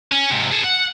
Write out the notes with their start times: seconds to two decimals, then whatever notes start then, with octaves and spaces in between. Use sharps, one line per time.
0.12 C#4
0.31 G#2 C3
0.51 G#4 A4
0.64 F#5